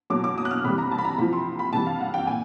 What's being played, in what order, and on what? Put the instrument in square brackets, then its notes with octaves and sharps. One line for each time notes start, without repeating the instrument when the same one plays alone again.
[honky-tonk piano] B2 F#3 D6
D6
D#6
F#6
F6
C3 E3 G3 B5
A#5
A5
B5
A#5
C3 F3 B5
C6
B5
C3 E3 G3 A5
F5
F#5
G5
A#2 G#5